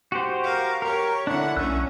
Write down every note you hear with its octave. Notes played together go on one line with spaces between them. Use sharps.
F#4 G4 C5
A#4 F5
G4 A#4 C#5
D3 D4 E4 F#5
B1 A#3 C#4 E6 F#6